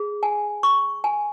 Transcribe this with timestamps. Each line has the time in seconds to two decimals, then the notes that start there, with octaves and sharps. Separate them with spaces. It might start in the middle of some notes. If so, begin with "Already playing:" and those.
Already playing: G#4
0.23 G#5
0.63 C#6
1.04 G#5